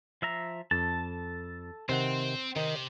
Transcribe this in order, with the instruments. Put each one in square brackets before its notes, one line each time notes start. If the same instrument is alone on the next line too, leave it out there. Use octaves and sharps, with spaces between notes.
[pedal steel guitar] F3 E5 A#5
[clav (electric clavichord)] F2 [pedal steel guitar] A4 A5
[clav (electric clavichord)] C3 D#3 F#5 [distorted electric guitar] C4 [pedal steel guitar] C5
[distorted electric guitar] C3 [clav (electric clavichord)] D#3 D#4